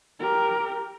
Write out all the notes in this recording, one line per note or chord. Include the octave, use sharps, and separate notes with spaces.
G4 A#4